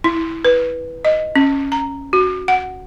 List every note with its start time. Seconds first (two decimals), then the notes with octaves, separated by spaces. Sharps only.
0.04 E4
0.45 B4
1.05 D#5
1.36 C#4
1.72 A#5
2.13 F#4
2.48 F#5